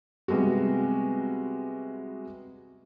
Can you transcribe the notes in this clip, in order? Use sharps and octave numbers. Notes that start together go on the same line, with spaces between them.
C3 G3 G#3 B3 F#4